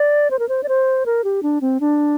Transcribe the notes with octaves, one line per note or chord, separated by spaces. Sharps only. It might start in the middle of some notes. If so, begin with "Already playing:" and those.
Already playing: D5
C5
A#4
C5
D5
C5
A#4
G4
D4
C4
D4